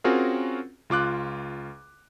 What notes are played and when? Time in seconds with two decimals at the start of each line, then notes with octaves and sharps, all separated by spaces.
0.04 C4 C#4 F4 F#4 G#4 A#4
0.90 C#2 F4 D6 F#6